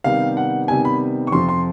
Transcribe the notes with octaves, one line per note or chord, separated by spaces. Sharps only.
C3 D#3 G3 B3 F5
F#5
C3 D#3 G3 B3 G#5
B5
C#6
F2 C3 F3 C6
C6